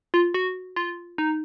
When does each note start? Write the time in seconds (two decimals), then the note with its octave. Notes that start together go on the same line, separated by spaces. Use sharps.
0.14 F4
0.34 F#4
0.76 F4
1.18 D#4